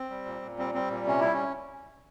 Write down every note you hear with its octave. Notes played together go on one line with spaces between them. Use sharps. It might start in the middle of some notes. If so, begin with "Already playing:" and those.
Already playing: C4
G3
A#2
A#2
G3 C4
G3 C4
A#2
C3 C#4
G3 E4
C#4